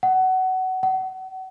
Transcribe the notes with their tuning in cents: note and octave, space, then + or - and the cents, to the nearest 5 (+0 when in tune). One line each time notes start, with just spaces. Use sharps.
F#5 +20
F#5 +30